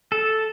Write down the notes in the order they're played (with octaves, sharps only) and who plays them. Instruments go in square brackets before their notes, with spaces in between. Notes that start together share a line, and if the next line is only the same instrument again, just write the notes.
[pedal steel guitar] A4